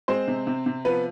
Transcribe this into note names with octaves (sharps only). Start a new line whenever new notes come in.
G#3 C4 C5
C3
C3
C3
F3 B3 B4